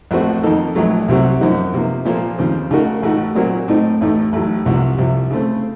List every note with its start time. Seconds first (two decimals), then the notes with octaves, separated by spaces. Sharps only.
0.11 A#1 A2 A3 C4 F#4
0.43 F2 D#3 A#3 D#4 A4
0.75 A#1 A#2 F#3 A3
1.08 C2 C3 F#3 C4 F#4
1.41 F#2 F3 C4 D#4 F#4
1.74 C3 F3 A#3
2.05 A#2 F3 A#3 F4 A4
2.38 D#2 C#3 F3 C4
2.71 C#3 A3 D#4 F#4 A#4
3.02 A1 A2 A3 D#4 F#4
3.35 A#2 F#3 C4 F#4 A#4
3.68 A2 A3 C4 D#4
4.01 A1 A2 A3 D#4
4.33 A1 A2 F#3
4.65 C2 C3 F3 C4 F#4
4.98 C2 C3 F3
5.31 C#3 A3 C4